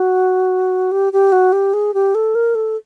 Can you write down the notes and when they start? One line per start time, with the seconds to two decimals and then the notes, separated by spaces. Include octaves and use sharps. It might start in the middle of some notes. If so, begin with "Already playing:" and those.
Already playing: F#4
0.91 G4
1.13 G4
1.32 F#4
1.52 G4
1.74 G#4
1.94 G4
2.15 A4
2.35 A#4
2.55 A4